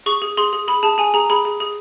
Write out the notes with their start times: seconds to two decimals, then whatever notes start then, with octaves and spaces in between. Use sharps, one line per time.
0.06 G#4 C#6
0.22 G#4
0.37 G#4 C6
0.53 G#4
0.68 G#4 B5
0.83 G#4 A5
0.98 G#4 G#5
1.14 G#4 A#5
1.30 G#4 B5
1.45 G#4
1.60 G#4